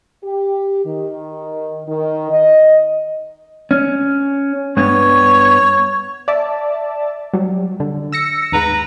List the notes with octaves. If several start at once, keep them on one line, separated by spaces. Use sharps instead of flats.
G4
D#3
D#3
D#5
C#4
G2 B3 C#5
D5 E5 A5
F#3 G3
D3
E6 A#6 C#7
D#2 G#2 B4 A#5